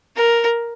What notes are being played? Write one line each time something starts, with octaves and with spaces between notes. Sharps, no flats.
A#4